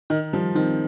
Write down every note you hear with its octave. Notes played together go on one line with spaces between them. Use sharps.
D#3 D#4
F3 G3
D#3 C4